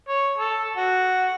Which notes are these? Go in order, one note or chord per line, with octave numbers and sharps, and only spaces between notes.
C#5
A4
F#4